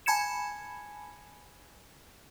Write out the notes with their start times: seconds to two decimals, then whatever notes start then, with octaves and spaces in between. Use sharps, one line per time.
0.06 G#5 A5 B5 G#6 C#7 E7